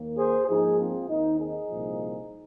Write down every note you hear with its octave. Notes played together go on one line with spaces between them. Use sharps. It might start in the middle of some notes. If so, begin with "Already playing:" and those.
Already playing: D#2 D#3 A#3
G#4 C5
G#2 F3 A#3 D#4 G#4
C4 F4
D#2 D#3 C4 D#4
D#4 G#4
C2 A#2 F3